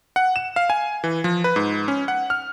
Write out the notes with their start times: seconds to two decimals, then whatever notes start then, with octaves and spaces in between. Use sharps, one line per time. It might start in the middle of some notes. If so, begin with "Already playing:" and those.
0.16 F#5
0.36 E7
0.56 F5
0.70 G#5
1.04 E3
1.24 F3
1.44 B4
1.56 G#2
1.88 C#4
2.08 F#5
2.30 F6